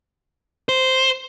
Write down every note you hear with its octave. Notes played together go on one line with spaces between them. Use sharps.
C5